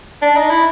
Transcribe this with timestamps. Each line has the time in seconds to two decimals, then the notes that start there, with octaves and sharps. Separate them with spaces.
0.22 D4
0.37 D#4
0.50 E4